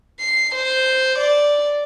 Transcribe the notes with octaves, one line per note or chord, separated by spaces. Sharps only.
C7
C5
D5